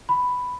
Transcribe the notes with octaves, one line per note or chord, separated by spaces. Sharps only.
B5